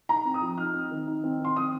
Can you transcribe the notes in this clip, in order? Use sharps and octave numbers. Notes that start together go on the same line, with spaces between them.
D#4 A#5
C4
D#6
F3
D#4 F6
C4
D#3
D#4
C4
D#3 C6
C4 D#6